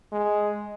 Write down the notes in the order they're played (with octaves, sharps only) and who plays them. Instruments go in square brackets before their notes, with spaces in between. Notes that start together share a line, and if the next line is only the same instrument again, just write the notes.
[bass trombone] G#3